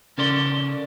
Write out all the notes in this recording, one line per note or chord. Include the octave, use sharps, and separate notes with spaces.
C#3 C#4 A4 A#4 D5 C6